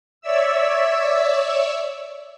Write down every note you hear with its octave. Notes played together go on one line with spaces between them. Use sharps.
C#5 D5 E5 E6